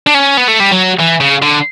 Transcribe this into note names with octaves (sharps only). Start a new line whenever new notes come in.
D4
C#4
B3
A3
G3
F#3
E3
C#3
D3